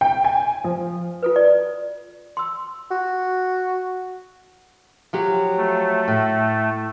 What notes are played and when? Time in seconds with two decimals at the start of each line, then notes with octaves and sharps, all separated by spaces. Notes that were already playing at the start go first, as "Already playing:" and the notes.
0.01 G5
0.24 G#5
0.64 F3
1.23 F4 A4 B4
1.36 D5
2.37 C6 E6
2.91 F#4
5.13 F3 F#3 G4
5.57 A3
6.08 A2